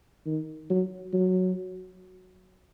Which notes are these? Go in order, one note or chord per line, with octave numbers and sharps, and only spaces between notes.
D#3
F#3
F#3